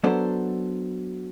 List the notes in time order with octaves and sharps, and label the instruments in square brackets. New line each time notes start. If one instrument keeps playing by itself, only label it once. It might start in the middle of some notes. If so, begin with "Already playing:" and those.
[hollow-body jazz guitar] F#3 B3 D4 A4 C5